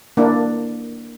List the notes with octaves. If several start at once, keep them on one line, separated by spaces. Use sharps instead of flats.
A#3 D4 E4